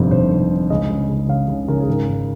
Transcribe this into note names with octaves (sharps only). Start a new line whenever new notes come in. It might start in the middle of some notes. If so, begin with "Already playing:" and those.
Already playing: G1 F2 C3
C3 C5
C3
D#3
C#2 D#5
C#3
C#2
C#3 F5
C#3
C#3 A#4
G#4
G#1 A#4
G#1